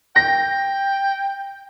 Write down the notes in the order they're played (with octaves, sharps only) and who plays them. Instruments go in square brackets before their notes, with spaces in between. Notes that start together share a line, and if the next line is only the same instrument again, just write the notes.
[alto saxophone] G5 [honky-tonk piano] A#6